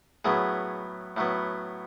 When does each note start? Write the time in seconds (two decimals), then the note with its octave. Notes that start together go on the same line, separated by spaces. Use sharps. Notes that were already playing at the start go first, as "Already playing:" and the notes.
0.25 A2 F#3 B3 G#4
1.17 A2 F#3 B3